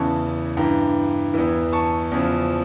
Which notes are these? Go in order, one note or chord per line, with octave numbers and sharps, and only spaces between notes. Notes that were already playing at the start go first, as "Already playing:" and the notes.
Already playing: E2 C#3 E3 A5 C#6
G2 E3 G5 A#5
E2 E3
A5 C#6
E2 C#3 F3